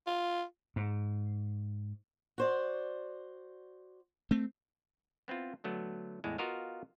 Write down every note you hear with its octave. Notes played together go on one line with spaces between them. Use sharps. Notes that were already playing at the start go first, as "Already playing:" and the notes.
F4
G#2
F#4 C5 D5
A3 C4
B3 C4 E4 F4
D3 F#3 A3 B3
E2 A2 G#3
B3 F4 F#4 A#4 D#5 F5